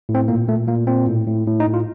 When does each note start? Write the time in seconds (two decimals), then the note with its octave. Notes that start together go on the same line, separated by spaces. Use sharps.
0.09 A2
0.15 C4
0.28 A#2 A#3
0.48 A#2 A3
0.68 A#2 A#3
0.87 A#2 C4
1.08 A2
1.27 A2
1.47 A2
1.60 D#4
1.67 A2
1.74 F4